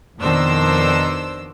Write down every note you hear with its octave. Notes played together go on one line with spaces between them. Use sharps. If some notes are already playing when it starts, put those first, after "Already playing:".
F2 B2 D#3 D4 C5 E6